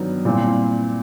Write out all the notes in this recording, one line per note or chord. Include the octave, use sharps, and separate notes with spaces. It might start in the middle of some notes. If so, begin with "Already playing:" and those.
Already playing: G2 D#3 F#3 B3 D#4
A#2 G3 C4 E4